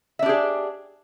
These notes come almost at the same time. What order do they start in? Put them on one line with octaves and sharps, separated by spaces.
E5 D4 G4 G#4